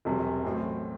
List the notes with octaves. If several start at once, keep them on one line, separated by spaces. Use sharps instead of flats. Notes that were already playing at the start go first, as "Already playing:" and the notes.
E1 E2 C3 F#3
A1 A2 F#3 C4